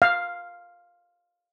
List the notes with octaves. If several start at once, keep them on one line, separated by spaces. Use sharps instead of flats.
F5